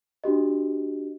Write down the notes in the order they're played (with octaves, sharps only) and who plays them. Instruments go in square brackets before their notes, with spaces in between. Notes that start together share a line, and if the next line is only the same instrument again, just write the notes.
[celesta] D4 F#4 G4 D#5